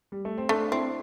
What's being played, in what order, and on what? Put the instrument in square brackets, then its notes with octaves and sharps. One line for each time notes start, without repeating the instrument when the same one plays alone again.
[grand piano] G3
A3
C4
[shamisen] A3 [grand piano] D4
[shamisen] C4 [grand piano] E4